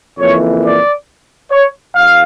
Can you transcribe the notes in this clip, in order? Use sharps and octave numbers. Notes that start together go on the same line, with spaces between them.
F2 C#3 E3 A#3 C#5
D5
C#5
E2 F5